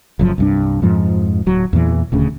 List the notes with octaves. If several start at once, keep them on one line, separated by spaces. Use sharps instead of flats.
F#1 F#2 F3
C2 G2 D4
F2 G#2 F3
D1 F#3
E2 A#2 E3
D#1 D2 C#3